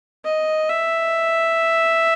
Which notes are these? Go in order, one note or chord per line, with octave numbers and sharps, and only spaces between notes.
D#5
E5